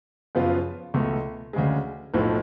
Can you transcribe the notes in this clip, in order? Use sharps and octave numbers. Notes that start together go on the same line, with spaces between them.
F#2 C#3 F3 B3 F4
C#2 B2 A3
D2 C#3 G#3
B1 A2 F3